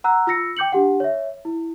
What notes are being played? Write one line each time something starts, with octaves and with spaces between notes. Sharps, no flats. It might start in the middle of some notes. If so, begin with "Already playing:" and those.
F#5 A#5 E6 F#6
F4 E6 A#6 C#7
G5 D6 G6 C#7 F#7
D4 G4 F#5
C#5 E5
E4